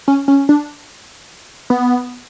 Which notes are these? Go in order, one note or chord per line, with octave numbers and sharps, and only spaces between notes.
C#4
C#4
D4
B3